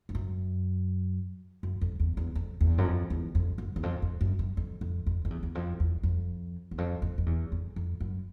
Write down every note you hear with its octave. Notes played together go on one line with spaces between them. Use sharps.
G2
F#2
F#2
F2
E2
E2
F2
E2
F#2
F2
E2
F2
F#2
E2
F2
F2
F#2
F#2
F2
F2
F2
F2
E2
E2
F2
E2
F2
E2
F2
F2
F2
E2
F2
F2
F#2